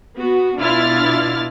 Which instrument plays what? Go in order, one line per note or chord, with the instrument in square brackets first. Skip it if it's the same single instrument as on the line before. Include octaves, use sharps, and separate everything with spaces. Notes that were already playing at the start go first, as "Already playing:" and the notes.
[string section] B3 F#4
B2 D4 E4 F4 F6 A6